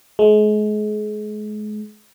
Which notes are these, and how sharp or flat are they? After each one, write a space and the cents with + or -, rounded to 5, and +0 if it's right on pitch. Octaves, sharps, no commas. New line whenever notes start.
G#3 +35